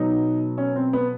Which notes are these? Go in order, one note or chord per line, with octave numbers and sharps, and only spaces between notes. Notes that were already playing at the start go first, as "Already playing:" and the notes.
Already playing: B2 F#3 D#4
C#4
C4
B3